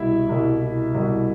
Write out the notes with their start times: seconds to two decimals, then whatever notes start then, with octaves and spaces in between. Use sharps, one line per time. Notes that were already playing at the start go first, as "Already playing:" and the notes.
Already playing: C2 B2 G3 E4 E5
0.29 C2 B2 G3
0.94 C2 B2 G3